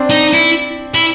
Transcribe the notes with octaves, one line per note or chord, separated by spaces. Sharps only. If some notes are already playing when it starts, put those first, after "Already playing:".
Already playing: C4 D4
D#4
E4
E4